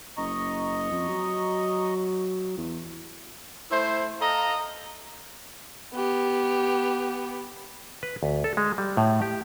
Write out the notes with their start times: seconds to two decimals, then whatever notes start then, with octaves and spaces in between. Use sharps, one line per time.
0.17 F#1 D#5 A#5 C#6
0.91 F2
1.08 F#3
2.57 E2
3.71 A3 E4 C5
4.20 A4 D#5 F5 A#5
5.94 B3 G4
8.03 B4
8.23 D2
8.44 A4
8.57 G#3
8.78 G3
8.97 A2
9.22 G4